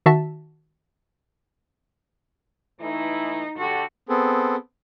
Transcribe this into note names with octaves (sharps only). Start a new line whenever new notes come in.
D#3 F#4 E5 A5 B6
E3 A3 D#4 E4
D3 F#4 G4 A4
B3 C4 G#4 A4